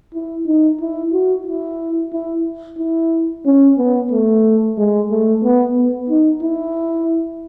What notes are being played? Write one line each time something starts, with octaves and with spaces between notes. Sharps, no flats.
E4
D#4
E4
F#4
E4
E4
E4
C#4
B3
A3
G#3
A3
B3
B3
D#4
E4